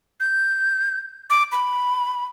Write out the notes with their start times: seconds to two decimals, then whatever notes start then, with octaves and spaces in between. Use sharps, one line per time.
0.20 G6
1.30 D6
1.52 B5